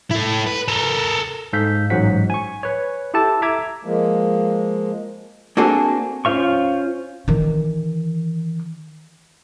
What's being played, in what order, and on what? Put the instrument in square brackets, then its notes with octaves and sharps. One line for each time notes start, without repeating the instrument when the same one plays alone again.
[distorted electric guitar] E4 A4
B4
A4 A#4
[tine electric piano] G#2 A4 F5 G6 B6
A1 G#2 F#3 C5 F#5 B6
G#5 C#6
B4 C#5
E4 G4 A4 A5
E5 A#5 D6 G#6
[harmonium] F3 G#3 A#3
[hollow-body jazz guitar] A#3 C4 D4 F#4 G#4 A4
[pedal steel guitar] C#4 F4 C5 F5 C#6
[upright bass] D#3 E3